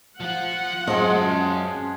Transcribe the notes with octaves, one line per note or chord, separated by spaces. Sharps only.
F3 F4 F#5
F#2 F3 G#3 C#4 G#4 D#5 C6